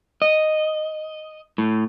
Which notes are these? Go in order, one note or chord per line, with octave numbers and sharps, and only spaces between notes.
D#5
A2